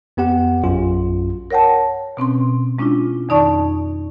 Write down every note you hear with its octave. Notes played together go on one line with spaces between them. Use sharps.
F2 B3 G4 F#5
A#1 F#2 F4
A#4 C#5 F#5 G5 A5
B2 C4 C#4 C6
G#3 C#4 D4 E4 F4
F2 D#3 D#4 D5 A5 C#6